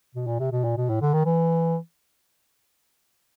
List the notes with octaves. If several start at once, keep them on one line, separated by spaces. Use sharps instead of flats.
B2
A#2
C3
B2
A#2
B2
A2
D3
D#3
E3